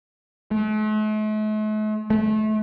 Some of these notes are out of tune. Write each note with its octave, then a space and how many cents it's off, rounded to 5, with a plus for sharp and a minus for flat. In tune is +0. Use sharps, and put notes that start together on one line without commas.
A3 -45
A3 -30